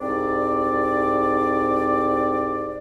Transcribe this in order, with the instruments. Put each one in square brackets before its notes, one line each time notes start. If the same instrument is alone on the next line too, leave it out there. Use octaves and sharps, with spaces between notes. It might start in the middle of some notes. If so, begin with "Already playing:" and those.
[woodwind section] C2 G#2 C4 D5